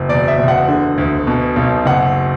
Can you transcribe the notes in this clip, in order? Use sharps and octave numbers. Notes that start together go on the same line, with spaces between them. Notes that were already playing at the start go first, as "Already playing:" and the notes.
Already playing: F#1
E1 D5
E5
E1
F#5
D3
D2
B2
B1
F#1 F#5